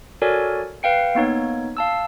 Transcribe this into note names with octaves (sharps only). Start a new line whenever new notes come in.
F#4 A4 A#4 C#5 D5 G#5
B4 F5 G5 C#7
A#3 B3 D#4 C#5
F5 A5 E6